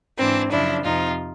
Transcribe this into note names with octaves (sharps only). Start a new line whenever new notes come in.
G#2 E3 C4 D4
F#2 C#3 F3 D4 E4
F2 C3 F3 D#4 F4